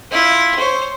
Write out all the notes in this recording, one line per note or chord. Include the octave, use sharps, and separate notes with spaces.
E4 F4
C5 C#5